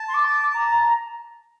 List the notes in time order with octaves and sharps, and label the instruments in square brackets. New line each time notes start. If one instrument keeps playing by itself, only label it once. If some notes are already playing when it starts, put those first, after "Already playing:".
Already playing: [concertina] A5
[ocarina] C6
D6
A#5